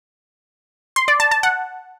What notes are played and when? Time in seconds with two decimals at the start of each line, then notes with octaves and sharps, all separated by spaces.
0.96 C6
1.08 D5
1.20 A5
1.31 A5
1.43 F#5